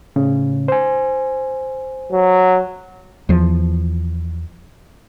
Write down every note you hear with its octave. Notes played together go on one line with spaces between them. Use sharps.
A2 C#3 C#4
C5 G#5
F#3
E2 F3